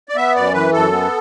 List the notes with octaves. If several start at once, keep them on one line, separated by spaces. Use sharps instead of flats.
D5
B3 E5
F#2 D5
E3 B4
F#2 A4
B3